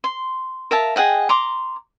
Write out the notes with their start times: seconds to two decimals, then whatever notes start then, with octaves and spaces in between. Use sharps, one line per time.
0.04 C6
0.71 A#4 E5 F5 A5
0.96 G#4 D#5 F#5 G5
1.29 A#5 C6 D6